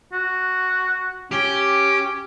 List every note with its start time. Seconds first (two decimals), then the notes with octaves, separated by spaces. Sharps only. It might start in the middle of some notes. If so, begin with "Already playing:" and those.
0.13 F#4
1.31 C#4 G4